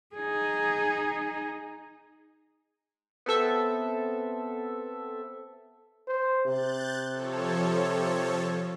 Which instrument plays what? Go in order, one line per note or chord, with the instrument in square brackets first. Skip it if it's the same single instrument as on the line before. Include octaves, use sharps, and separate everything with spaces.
[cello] D#4 G#4
[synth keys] B3 C4 A4 E5
[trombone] C5
[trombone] C3 [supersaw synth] F#6 G6 A6
[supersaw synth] F3 A4 C#5